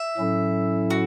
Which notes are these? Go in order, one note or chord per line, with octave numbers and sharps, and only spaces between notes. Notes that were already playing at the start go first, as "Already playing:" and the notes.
Already playing: E5
A2 F#3 C#4 E4 A4
F#4